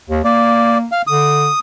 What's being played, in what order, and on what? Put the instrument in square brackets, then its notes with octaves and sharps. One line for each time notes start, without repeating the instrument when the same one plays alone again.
[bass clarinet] D#2
[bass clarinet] A#3 [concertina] D5
[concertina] F5
[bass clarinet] D3 [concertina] D#6